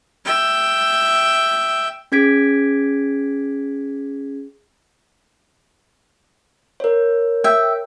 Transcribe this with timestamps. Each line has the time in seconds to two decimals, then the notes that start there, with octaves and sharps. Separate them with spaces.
0.25 E5 G5
2.12 C#4 G#4 G#6 B6 D7
6.80 A#4 C#5
7.44 E5 G5